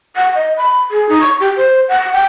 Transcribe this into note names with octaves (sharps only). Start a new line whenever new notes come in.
F#5
D#5
B5
G#4
D#4
C#6
G4
C5
F#5
G5